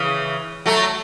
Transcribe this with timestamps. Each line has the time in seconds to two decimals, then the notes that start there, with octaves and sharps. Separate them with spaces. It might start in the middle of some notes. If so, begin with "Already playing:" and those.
Already playing: C#3 E3
0.66 F#3 A3